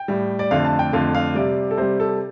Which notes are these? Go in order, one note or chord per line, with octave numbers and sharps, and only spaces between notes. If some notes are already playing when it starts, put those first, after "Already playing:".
Already playing: G5
A2 G3
D5
F2 D3 A3 F5
A5
G5
F2 D3 A3 F5
F5
C3 G3 D5
A4
C3 G3 C5
A4